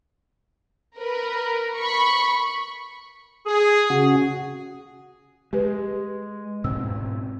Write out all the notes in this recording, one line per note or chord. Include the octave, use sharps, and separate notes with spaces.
A#4 B4
B5 C#6
G#4
C#3 F#4
G#3 G4 B4
G#2 B2 C4 E6